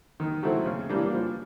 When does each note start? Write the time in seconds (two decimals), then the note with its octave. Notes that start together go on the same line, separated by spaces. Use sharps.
0.20 D#3
0.43 F#3 A3 C4 E4
0.66 C#3
0.89 E3 G3 A#3 D4
1.13 F3